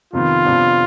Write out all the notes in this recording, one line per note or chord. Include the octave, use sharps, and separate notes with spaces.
F2 C3 D#3 B3 F4
F2 C3 F3 B3 D4